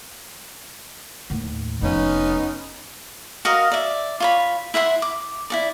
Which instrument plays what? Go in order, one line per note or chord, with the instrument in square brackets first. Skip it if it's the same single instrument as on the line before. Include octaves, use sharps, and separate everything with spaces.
[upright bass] D#2 A2
[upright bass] F1 F2 [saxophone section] B3 C#4 D#4
[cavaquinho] F#4 A#4 D#5 F5
D5 E5
F4 C#5 B5
E4 E5 F#5 C6
D6
E4 F#4 D5